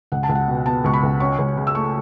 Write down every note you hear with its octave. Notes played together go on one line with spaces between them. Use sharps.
C#2 F#5
A5
C#2
F#5
B2
B3 A5
C#2 C#6
B5
C#2
C#4 C#6
C#2
C#3
E6
A3 C#6